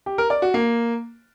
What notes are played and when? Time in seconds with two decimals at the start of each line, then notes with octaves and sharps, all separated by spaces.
0.06 G4
0.18 A#4
0.30 D5
0.42 F#4
0.54 A#3